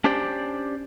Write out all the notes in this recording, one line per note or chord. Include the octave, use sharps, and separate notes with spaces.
C#4 D4 G4 C5 D5 G5